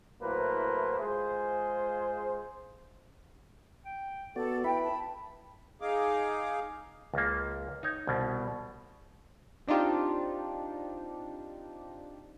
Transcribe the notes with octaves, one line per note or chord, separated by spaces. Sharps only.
A2 F#3 A#3 E4 B4 C5
G#3 F4 G#4 C5
G5
B3 F#4 A4 D5
E4 B4 E5 G5 B5
A5
D#4 G#4 F5 D6
C#2 A#3
D#4 C#5
C2 B2
C4 D4 D#4 F4 G4